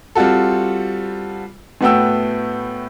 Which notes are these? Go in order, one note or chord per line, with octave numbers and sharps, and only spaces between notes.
G3 C4 F4 F#4 A4
A2 A3 B3 F#4 G5 E6